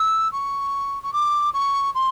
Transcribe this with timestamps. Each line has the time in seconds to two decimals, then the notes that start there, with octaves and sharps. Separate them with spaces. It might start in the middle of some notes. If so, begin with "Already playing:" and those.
Already playing: E6
0.32 C#6
1.03 C#6
1.13 D6
1.54 C#6
1.95 C6